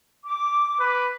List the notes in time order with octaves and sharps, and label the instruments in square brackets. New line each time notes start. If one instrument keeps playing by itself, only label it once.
[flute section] D6
[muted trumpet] B4